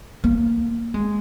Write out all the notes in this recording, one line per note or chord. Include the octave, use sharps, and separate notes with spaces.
A#3
G#3